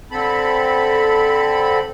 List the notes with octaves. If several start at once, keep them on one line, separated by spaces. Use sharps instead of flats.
D3 C4 A4 B5